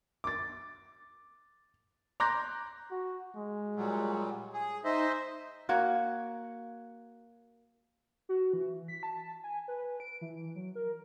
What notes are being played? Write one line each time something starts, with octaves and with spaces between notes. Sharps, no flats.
D6 A6
A#5 C6 D6 F#6 G6 A#6
F#4
G#3
A#2 F#3 G3
G#4
D#4 C5 D#5 E5
A#3 F#4 C#5
F#4
E3
B6
A5
G#5
B4
D7
E3
F#3
A#4